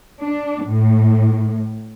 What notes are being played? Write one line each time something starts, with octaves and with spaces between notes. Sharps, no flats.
D4
A2